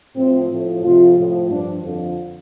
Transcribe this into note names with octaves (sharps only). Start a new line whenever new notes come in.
A2 F3 C4
A2 F3
F2 C3 F3 F4
A2 F3
G2 F3 D4
F2 D3 F3